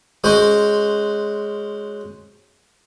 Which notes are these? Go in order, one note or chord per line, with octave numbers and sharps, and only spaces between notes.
G#3 C#4 F#4 C5